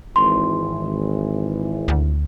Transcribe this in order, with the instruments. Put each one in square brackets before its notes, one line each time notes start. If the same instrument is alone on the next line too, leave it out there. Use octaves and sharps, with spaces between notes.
[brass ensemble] G#1 E3 [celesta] C6
[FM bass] D2